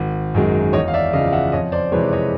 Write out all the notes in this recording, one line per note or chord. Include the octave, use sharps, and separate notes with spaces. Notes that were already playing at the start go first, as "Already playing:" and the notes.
Already playing: G#1
F#2 D#3 G#3
E2 C#5 D#5
F5
D5 E5
C#3 F3 D#5 F5
F5
E5 F#5
F2 C#5 D#5
C5 D5
C3 E3 G#3 B4 C#5
C#5 D#5